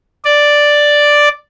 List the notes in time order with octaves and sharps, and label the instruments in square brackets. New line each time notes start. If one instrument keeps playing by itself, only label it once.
[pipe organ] D5